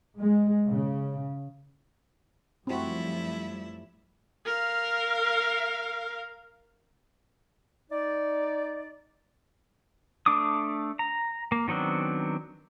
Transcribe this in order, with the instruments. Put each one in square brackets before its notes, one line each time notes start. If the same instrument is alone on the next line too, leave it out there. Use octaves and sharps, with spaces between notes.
[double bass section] G#3
C#3
[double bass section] F#2 F3 G3 [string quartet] A3 E4 [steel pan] C4 F#4
[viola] A#4 F5
[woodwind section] D#4 D5
[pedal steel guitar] A3 D4 D6 D#6
A#5
A#3
D#3 F#3 B3 C4 D4